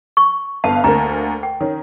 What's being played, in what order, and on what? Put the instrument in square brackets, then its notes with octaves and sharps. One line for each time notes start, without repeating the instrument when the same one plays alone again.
[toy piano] C#6
[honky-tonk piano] G1 B3 F5 [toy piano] A5
[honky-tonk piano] D2 A#3 A#4 [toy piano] A#5
[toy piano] G5
[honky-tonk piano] D#3 C#4